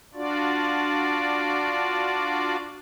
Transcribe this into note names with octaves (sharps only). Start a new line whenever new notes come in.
D4 F4 F#4 D5